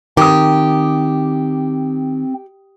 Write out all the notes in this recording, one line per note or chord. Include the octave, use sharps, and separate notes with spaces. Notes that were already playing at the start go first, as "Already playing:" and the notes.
D#3 C4 G4 D6 D#6